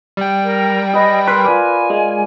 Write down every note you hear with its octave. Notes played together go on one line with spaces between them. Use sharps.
G3 G5
A#4
G#4 B4 D#5
A#4 B4 C6
F4 D5 G#5
G#3